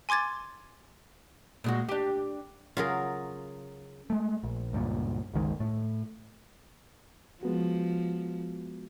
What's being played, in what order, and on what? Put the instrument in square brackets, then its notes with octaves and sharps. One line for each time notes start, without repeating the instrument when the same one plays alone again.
[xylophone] G#5 C6 D6 G#6 A6
[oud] A#2 G#3 F#4
D4 G4
[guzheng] C#3 F#3 G#4 [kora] F4 A#4
[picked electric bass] G#3 A3
A#1
C#2 G2 A#2
G1 C#2 D#3 G#3
A2 A3
[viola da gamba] F3 [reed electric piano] G#3 B3 F#4